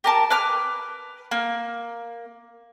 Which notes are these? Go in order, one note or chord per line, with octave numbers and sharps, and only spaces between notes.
G4 A#4 A5
B4 D6 F6
A#3